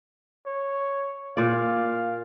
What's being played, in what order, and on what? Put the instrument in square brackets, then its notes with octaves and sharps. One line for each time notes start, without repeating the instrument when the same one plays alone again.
[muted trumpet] C#5
[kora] A#2 D5 [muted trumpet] F5